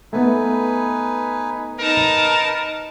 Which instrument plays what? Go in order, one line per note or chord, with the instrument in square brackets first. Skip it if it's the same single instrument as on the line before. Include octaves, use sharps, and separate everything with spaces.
[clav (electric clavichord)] A3 B3 [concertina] D#4 B4 G#5
[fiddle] D#4 A5 [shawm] A#4 [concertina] B4